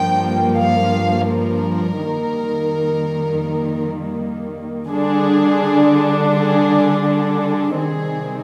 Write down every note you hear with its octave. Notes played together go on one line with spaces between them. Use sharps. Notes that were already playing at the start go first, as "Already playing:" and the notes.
Already playing: G2 F3 A#3 G5
F5
A#4
F2 D#3 G3 A#3
D3 G3 D4 G#4
G#4
G#4
C3 D#3 G3 C4 G#4